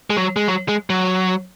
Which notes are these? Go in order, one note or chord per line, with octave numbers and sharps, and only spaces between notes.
G#3
F#3
G#3
F#3
G#3
F#3